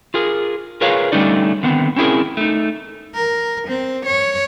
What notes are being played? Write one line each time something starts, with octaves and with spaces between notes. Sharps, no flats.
F4 G#4 A#4
F4 G#4 A#4 B4 C#5 F5
D3 G3 A3 C#4 D#4 D5
D3 D#3 B3 C4
C4 C#4 E4 G#4 A#4
A3 D#4
A#4
C4
C#5